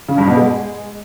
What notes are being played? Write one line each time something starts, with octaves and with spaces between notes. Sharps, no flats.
C#3
G2
B2
G#3